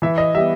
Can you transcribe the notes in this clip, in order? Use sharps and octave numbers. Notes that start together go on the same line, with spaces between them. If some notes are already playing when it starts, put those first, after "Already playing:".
E3 E5
D#5
G3 B3 E5